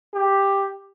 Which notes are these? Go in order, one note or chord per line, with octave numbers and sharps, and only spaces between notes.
G4